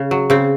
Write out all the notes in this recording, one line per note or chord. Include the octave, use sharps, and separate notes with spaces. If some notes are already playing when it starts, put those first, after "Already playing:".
Already playing: C#3
F#3
C#3 C4